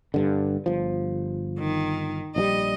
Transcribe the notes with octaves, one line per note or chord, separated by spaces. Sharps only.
G1 G2 D3
G1 F3
D#3
A#1 F3 G3 D#5